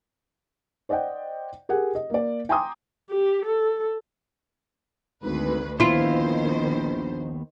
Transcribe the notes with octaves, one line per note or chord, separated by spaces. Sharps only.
C5 D5 D#5 F#5 G5
G4 G#4 A#4 F#5
D#5
A#3 D5
G5 G#5 A#5 C6 D6 D#6
G4
A4
G#1 D2 B4
A#1 D#2 D#3 B3 E4 F4 C5